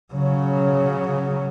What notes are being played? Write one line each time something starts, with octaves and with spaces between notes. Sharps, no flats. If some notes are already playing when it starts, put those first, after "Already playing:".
C#3 F#3